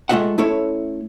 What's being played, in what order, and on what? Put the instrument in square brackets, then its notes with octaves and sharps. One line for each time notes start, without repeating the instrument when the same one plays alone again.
[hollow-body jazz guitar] G#3 A3 F4 D#5 E5 F#5
A3 C#4 E4 A4 C#5